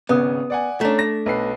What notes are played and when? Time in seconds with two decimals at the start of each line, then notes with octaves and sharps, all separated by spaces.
0.09 G#1 C#3 B3 D#6
0.50 D5 F#5 G#5
0.81 A3 C#4 D4 A5 A#5
0.99 A#6
1.26 B1 B4 C7